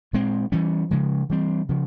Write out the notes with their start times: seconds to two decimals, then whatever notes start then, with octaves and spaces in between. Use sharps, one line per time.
0.13 A#2 G#3 C4
0.52 E3 G3 C#4
0.91 C#3 F3 G#3
1.29 E3 G3 C4
1.69 C#3 F3